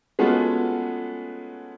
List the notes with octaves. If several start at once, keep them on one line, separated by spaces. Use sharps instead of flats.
G#3 A3 B3 C#4 F4 F#4